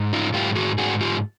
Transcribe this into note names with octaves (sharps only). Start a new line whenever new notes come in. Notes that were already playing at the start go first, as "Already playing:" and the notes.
Already playing: G#2
D#4 F4
G#2 F4 G4
F#4 G#4
G#2 F#4 G#4
F4 G4